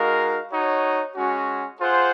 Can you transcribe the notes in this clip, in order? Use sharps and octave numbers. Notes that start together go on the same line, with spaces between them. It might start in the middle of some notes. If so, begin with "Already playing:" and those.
Already playing: G#3 D#4 F#4 A#4 F5
D#4 F#4 C#5
G#3 C#4 F#4
F4 G#4 C5 F#5